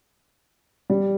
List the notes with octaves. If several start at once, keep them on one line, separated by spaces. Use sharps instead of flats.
G3